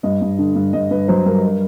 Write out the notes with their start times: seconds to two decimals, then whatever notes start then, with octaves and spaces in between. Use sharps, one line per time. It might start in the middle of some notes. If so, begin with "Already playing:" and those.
0.03 G2 D#5
0.22 G2
0.38 D3
0.55 G2
0.73 G2 D#5
0.91 G2 B4
1.08 F#3 C5
1.26 G2 A#4
1.43 A#4